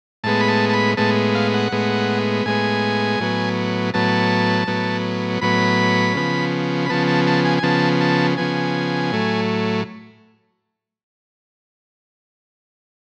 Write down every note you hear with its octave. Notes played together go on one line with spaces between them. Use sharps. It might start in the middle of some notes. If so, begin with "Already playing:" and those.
A2 G#3 B3 A5
B5
A5
A5
B5
A2 G#3 B3 A5
F5
F#5
A2 G#3 B3
A2 G#3 B3 G#5
A2 F#3 B3
A2 F#3 B3 A5
A2 F#3 B3
A2 F#3 B3 B5
C#3 F3 B3
B5
C#3 F3 B3 A5
A5
A5
G#5
G#5
C#3 F3 B3 A5
A5
C#3 F3 B3 G#5
A2 F#3 A3